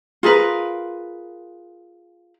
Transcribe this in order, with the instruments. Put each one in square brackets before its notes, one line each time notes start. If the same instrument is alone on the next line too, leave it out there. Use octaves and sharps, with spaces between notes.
[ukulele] F4 G#4 A#4 B4